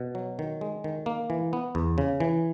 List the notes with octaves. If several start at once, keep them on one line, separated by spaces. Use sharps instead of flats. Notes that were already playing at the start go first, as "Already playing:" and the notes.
Already playing: B2
F#3
D#3
G#3
D#3
A#3
E3
B3
E2
C#3
E3